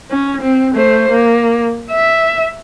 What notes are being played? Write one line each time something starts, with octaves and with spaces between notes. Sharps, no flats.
C#4
C4
A3 C5
A#3
E5